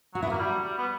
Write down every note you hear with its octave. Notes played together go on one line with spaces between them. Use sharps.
F#3 F#4
B3 E4
A#3 F#4
G3
G3
B3